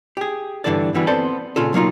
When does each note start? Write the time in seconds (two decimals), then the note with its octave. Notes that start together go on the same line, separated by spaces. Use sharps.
0.17 G4 G#4
0.64 G2 D3 E3 D4 A4 D5
0.94 D3 E3 G3 B3 E4 F#4
1.07 B3 C4 A4 C5 D5 A5
1.56 A#2 C#3 F4 A4
1.73 B1 F#3 A#3 D#4 F4